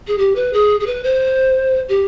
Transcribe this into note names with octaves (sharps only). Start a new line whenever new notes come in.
G#4
G4
B4
G#4
G#4
B4
C5
G4